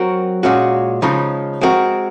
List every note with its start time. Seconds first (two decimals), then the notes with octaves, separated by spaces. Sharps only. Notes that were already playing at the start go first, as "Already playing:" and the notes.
Already playing: F#3 C4 F#4 A#4
0.43 A#2 G#3 C#4 F#4
1.02 C#3 F3 G#3 D#4
1.61 G#3 C4 F#4 A#4